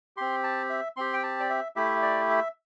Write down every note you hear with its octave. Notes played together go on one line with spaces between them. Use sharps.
C4 G4 C6
A5
E5
C4 G4 C6
G5
A5
D5
E5
A3 E4 G4 E5
D5
E5